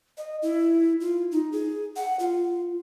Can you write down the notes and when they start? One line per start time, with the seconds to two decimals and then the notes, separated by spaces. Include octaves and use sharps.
0.18 D#5
0.42 E4
1.01 F4
1.32 D#4
1.52 G#4
1.96 F#5
2.19 F4